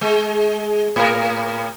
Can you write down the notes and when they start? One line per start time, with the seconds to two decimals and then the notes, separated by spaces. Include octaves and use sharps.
0.01 G#3
0.96 A2 A#4